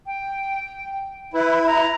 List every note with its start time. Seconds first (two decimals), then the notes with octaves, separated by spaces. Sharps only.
0.06 G5
1.34 E4 B4
1.66 A#5